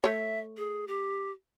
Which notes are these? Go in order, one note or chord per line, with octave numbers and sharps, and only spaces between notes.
A3 C#5 E5
G#4
G4